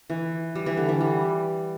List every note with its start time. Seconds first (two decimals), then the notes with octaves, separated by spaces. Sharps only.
0.10 E3
0.55 G3
0.66 E3
0.77 D3
0.89 E3
1.01 G3